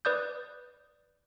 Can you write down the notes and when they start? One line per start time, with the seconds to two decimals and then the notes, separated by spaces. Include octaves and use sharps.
0.05 B4 D5 D#6 G6